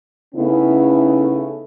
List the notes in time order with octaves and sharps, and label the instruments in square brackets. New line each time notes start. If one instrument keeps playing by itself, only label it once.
[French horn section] C#3 A3 B3 C#4 D#4 E4